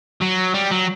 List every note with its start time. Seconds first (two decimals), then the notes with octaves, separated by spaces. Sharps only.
0.21 F#3
0.54 G3
0.71 F#3